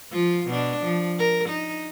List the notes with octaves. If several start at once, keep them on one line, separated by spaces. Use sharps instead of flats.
F3 F4
B2 D4
F3
A#4
D#4